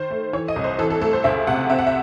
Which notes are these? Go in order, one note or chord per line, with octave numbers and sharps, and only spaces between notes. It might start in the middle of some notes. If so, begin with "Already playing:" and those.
Already playing: D#3 C5
A3
E3 C#5
D#5
C2
C5
E3 A4
A4
A3 A4
C5
C#2 E5
C3 F#5
C4 E5
F#5
E5